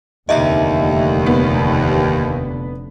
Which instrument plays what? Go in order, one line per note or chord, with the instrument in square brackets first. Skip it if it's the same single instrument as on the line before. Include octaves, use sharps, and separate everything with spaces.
[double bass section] F1 D3 [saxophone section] D#2 [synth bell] D#5 E5 A#5
[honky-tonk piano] B3